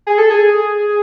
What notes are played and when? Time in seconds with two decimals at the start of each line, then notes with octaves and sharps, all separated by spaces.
0.07 G#4
0.18 A4
0.31 G#4